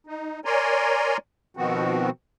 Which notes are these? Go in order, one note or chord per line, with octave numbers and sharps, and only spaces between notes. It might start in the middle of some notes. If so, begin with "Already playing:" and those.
D#4
A#4 C#5 D5 G#5 A#5 C6
B2 D#3 F3 B3 C4 F#4